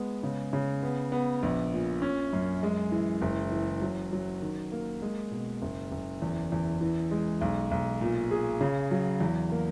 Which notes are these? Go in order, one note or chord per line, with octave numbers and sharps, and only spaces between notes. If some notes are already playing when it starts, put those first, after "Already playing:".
Already playing: G#3 B3
C#3
C#3
B3
B3
A#1
A#2
C#4
F#2
G#3
E3
F#1
E3
F#3
F#3
D#3
A#3
G#3
B2
F#1
F#1
E2
E2
E3
G#3
B1
B1
A#2
G#4
C#3
F#3
E2
A#3